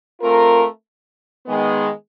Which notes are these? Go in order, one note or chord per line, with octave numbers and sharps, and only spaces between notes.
A3 C4 F4 A#4
D#3 G#3 B3